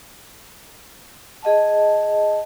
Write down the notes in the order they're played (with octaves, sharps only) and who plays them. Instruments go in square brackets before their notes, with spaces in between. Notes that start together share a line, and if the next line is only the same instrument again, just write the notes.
[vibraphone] G#4 D#5 F#5 A5